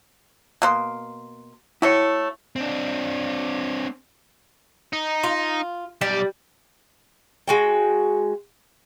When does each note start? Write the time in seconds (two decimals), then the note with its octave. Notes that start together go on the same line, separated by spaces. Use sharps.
0.62 B2 A#3 C6
1.82 A3 E4 F#4 C#5
2.56 C4 D4
4.93 D#4
5.23 F4
6.01 B1 G3 D5
7.48 G#3 F#4 G5